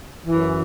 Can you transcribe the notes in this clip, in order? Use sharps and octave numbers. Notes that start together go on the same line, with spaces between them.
F#2 E3